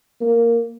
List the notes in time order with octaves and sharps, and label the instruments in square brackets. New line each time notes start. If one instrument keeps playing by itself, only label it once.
[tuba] A#3